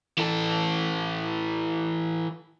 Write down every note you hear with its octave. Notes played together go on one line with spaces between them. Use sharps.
E3 A4